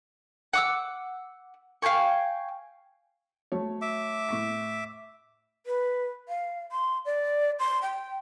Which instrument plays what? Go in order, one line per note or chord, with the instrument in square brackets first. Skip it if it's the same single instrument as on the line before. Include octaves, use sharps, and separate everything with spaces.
[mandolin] F#5 D6 E6
F5 G5 G#5 C#6
[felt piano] F#3 A3 C#5
[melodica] E5 D6
[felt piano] A2 C#6 B6
[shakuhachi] B4
F5
C6
D5
C6
G5